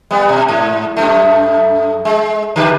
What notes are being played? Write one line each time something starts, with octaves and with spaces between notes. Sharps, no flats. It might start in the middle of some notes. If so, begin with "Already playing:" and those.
G3 B3
B2
G#2
F#2 A3
G#3
D3 G4 B4